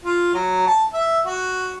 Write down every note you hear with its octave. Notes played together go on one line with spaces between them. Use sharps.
F4
F#3
A5
E5
F#4